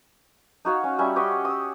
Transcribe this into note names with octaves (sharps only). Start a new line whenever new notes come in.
D#4 F#4 C#5 F5
C#4
G3 C#4 E5
G4 C#5 D#5 F#5
D#6 E6